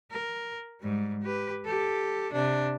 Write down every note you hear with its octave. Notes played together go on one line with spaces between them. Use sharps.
A#4
G#2 G3
G4 B4
G4 A4
C3 D4